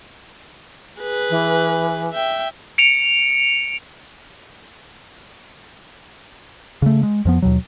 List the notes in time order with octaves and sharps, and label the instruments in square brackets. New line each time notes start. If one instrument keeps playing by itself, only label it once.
[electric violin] G#4 B4
[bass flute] E3
[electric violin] E5 G5
[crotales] C#7 D7 F7
[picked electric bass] C#3 A3
G#3
F2 F3 B3
D#2 B2 F#3